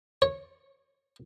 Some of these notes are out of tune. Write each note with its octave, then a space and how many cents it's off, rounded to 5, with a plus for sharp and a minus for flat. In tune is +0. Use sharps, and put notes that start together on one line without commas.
C#5 -15